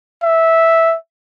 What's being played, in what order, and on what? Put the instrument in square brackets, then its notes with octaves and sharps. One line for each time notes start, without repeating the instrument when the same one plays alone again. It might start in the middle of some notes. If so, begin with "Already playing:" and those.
[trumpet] E5